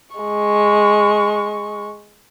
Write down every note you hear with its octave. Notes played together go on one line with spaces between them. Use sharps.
G#3 C#6